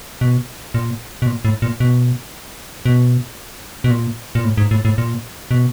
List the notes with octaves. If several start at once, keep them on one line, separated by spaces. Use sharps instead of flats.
B2
A#2
B2
A#2
A2
A#2
B2
B2
B2
A#2
A#2
A2
G#2
A2
A2
A#2
B2